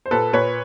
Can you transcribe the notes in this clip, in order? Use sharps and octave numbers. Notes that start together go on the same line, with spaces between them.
C5
A#2 A4 B4
A#2 B4 C#5